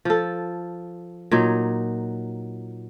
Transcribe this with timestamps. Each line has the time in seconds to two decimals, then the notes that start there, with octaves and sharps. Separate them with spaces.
0.05 F3 A4
1.31 A#2 F#3 D#4